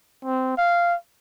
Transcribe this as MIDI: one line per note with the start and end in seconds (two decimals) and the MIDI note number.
0.25 0.53 60
0.58 0.95 77